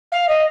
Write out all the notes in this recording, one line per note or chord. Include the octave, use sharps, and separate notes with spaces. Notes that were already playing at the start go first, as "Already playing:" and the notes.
F5
D#5